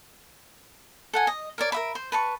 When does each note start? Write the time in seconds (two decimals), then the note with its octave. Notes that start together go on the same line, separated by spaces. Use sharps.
1.13 A4 F#5 G#5
1.27 D#5
1.58 A#4 C#5 D5
1.72 A#4 E5 B5
1.95 C5
2.12 B4 A5 C#6